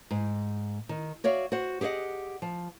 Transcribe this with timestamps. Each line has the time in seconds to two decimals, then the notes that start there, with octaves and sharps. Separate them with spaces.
0.11 G#2
0.89 D#3
1.24 F#4 C#5 D5 E5 F5
1.52 F#4 C5 F#5
1.81 G4 G#4 C#5 D#5 F#5
2.42 F3